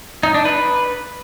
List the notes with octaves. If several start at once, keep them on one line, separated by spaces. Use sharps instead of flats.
D#4
D4
B4